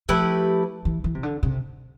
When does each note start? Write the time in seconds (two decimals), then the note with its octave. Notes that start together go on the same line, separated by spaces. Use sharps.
0.09 F3 A3 E4 G4 B4
0.85 E3
1.04 E3
1.15 C3
1.23 D3
1.43 C3